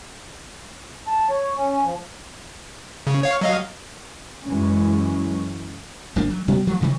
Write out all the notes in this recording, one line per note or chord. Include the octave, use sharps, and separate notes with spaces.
A5
C#5
C#4
F3
C#3
C#5 F5
F#3 D#5 F5
F#2 E3 G#3 C#4
G#1 F3 A#3 D4
F#3
D2 B2 F#3 B3
E3 F3 A3
G2 C3 D#3 F#3